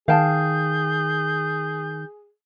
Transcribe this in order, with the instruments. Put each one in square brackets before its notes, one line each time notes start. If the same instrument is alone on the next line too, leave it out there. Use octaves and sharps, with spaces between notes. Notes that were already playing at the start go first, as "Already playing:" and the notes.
[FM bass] D#3 [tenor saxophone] G#4 [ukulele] F5 G5 A5 [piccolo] G6